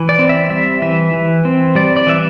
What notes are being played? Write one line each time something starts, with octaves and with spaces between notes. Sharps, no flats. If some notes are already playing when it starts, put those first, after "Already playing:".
Already playing: E3
D5
C4
E5
G3 E5
E3 E5
E3
C4
G3 D5
D5
E3 E5